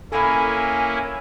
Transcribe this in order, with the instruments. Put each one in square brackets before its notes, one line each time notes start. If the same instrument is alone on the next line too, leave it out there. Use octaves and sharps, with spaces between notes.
[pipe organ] A#3 C#4 E4 [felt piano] A4 B5 [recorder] G#5